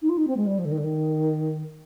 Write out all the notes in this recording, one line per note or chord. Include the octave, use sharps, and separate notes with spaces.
D#4
F4
D#4
C4
G#3
G3
F3
D3
D#3
D3
D#3